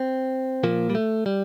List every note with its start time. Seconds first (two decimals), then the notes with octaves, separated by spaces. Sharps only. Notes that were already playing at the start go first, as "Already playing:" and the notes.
Already playing: C4
0.64 A#2 F3 A#3
0.90 G3
0.95 A3
1.26 G3